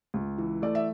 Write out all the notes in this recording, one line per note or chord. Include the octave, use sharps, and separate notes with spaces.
C#2
E3
A3 D5
E5